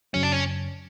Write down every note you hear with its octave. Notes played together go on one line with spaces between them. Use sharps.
F#2 C#3 F#3 C#4
D4
C#4